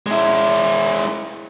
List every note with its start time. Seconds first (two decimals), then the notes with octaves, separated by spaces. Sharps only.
0.06 G#3 E4